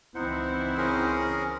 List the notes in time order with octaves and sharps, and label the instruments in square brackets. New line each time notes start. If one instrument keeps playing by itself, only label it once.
[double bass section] C#2 E3 C4 [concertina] D#4 C5 F#5 [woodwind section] E4
[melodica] C#4 G#4 A#4